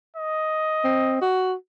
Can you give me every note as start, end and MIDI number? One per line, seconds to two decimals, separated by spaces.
0.16 1.30 75
0.84 1.21 60
1.21 1.54 66